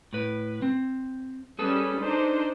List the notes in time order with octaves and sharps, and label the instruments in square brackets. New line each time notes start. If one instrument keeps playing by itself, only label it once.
[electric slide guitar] A2 B4
C4
[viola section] G3 C#4 [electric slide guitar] G#4 A4 B4
[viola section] D4 D#4 C5